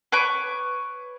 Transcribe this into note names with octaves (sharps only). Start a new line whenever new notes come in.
B4 C#5 C#6 D6